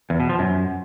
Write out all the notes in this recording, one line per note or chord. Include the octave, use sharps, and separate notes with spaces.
E2
B2
F3
F#2